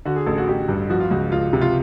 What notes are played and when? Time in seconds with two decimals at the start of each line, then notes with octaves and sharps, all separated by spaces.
0.05 D3 F#4
0.16 G#4
0.26 A1 A4
0.38 F#4
0.48 A1 G4
0.69 G2
0.90 F3 F#4
1.00 F4
1.11 C#2 F#4
1.32 C#2 F4
1.53 C3
1.61 F4